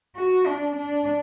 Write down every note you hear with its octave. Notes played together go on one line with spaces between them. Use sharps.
F#4
D4
D4